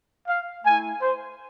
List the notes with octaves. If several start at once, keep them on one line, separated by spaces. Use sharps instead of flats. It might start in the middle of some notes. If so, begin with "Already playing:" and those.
F5
A3 E4 G#5
C5